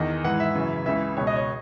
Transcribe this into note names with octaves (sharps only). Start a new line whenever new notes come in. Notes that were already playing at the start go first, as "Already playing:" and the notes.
Already playing: E2 D#3 D#5
G#2 E3 F#5
E5
F#2 C#3 E3
C#2 C#3 E3 E5
C#2 B2 C#5
D#5
C#5